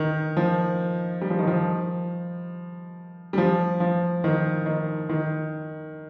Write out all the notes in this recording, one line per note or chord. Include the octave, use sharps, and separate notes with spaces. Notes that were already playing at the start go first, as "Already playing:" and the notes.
Already playing: D#3
F3
G3
F3
D#3
F3
G3
F3
F3
D#3
D#3
D#3